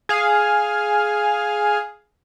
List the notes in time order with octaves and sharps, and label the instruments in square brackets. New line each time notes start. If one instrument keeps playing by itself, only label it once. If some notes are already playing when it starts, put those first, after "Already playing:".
[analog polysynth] G#4 F5